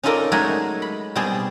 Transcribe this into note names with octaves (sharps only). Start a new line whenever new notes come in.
C#4 D#4 F4 A4 A#4 D5
F#3 G#3 A3 D#4 A#4 C#5
B5
B2 G3 C4 G#4 A5